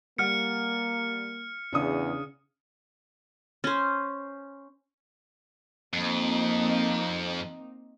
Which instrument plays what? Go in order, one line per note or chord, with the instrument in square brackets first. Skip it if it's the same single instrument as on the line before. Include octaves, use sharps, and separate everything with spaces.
[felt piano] G3 F#5 [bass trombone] A#3 [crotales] F6 C#7
[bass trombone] E2 [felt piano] C#3 D4 D#6
[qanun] C#4 C5
[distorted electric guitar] F2 [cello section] A#3 C4 D#4